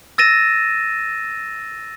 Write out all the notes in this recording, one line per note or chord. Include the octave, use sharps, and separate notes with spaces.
E6 A6 A#6 D#7 E7